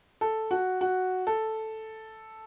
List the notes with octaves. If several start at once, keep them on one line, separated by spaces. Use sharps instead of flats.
A4
F#4
F#4
A4